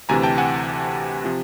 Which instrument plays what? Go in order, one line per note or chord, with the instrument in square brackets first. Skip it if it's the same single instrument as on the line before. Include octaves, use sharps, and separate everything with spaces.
[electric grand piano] D2 C3 E3 G#5 A#5
G5 A5
F#5 G#5
C3 F3